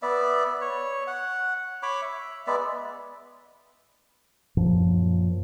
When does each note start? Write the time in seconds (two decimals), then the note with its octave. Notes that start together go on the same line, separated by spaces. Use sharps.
0.02 B3 D5 E5
0.61 C#5
1.07 F#5
1.83 C#5 B5 D6
2.02 E5
2.47 G#3 B3 D5 E5
4.57 F#2 A#2 F3